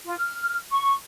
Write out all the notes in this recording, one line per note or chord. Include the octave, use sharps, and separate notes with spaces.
F4
F6
C#6